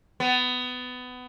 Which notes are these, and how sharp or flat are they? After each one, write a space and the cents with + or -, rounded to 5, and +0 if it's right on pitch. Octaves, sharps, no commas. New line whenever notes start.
B3 +20